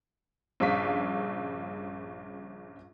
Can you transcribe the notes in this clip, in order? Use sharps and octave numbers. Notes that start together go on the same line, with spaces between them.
A#1 G2 C#3 F5 C#6 B6